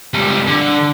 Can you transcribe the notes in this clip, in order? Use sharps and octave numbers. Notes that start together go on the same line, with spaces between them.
C#2 G3
D3